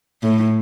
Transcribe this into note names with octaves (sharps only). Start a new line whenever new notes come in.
A2